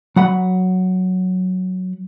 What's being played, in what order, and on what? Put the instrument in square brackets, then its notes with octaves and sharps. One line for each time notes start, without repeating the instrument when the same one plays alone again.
[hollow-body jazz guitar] F#3 F#5 B5